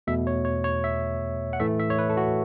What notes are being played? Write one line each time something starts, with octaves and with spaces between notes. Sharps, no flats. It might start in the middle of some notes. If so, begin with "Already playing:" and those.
E2 B2 A3 E5
C#5
C#5
C#5
E5
F#5
A2 E3 A3 E5
E5
C#5
B4
A4
F#4